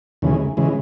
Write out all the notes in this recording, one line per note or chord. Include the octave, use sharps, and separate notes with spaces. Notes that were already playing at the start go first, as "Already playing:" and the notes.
D#2 C#3 E3 G#3
C#3 E3 G#3